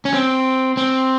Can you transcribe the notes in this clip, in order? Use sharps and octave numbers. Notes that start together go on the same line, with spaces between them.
C#4
C4
C4